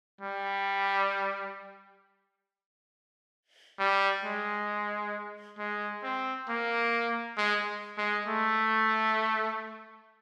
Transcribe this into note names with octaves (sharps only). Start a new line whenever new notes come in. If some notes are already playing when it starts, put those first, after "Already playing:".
G3
G3
G#3
G#3
C4
A#3
G#3
G#3
A3